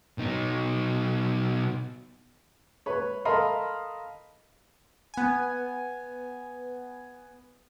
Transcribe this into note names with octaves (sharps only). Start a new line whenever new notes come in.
B2 D#4
B4 C#5
A4 A#4 D#5 F5 B5 C6
B3 G#5